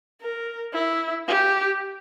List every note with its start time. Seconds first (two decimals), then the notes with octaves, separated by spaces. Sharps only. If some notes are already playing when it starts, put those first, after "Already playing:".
0.21 A#4
0.74 E4
1.28 G4